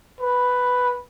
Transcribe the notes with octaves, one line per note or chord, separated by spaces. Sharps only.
B4